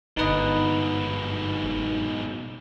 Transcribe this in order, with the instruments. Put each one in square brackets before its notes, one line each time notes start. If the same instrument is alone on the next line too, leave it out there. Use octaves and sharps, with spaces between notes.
[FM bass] G1 [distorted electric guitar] G#2 B2 [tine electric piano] D#4 B4 D#5